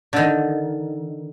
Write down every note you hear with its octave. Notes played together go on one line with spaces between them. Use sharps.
D3 D#3